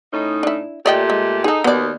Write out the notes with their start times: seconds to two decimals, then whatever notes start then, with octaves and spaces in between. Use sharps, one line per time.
0.13 A2 C#4 D#4
0.43 D4 E4
0.86 A#2 A3 G4 D5 D#5 G5
1.10 G#3
1.44 D#4 G#4 A4
1.64 D#2 B2 D#3 B3 D5